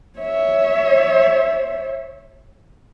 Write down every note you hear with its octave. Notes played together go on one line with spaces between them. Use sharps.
C#5 E5